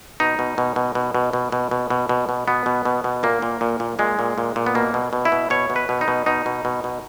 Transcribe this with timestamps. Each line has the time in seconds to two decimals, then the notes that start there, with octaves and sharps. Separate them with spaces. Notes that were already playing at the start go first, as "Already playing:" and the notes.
0.20 B2 D#4
0.39 B2
0.58 B2
0.76 B2
0.95 B2
1.15 B2
1.33 B2
1.52 B2
1.71 B2
1.90 B2
2.09 B2
2.29 B2
2.48 B2 B3
2.66 B2
2.85 B2
3.04 B2
3.23 A#2 A#3
3.42 A#2
3.61 A#2
3.80 A#2
3.99 A#2 G#3
4.19 A#2
4.38 A#2
4.56 A#2
4.66 B3
4.75 B2 A#3
4.94 B2
5.13 B2
5.25 E4
5.32 B2
5.50 B2 C#5
5.70 B2
5.76 B4
5.89 B2
6.01 D#4
6.08 B2
6.26 B2 D#4
6.46 B2
6.65 B2
6.84 B2